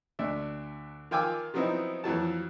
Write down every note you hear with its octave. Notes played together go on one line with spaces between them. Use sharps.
D2 D4 E5
D#3 F4 G5 G#5 D6 E6
F3 F#3 B3 C4 D#4 E4
F2 E3 F#3 A5